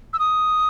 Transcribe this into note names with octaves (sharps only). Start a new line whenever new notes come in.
E6
D#6